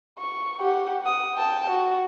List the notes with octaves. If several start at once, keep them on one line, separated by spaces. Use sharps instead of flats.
C#6
G4 F#5
F#5 D#6
G5 A5
F#4